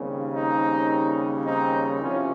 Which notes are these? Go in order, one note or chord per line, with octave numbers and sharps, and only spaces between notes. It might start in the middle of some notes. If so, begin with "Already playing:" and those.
Already playing: D#2 C#3 G3 C4
C4 D#4
C4 D#4
C2 C3 F3 C#4 F4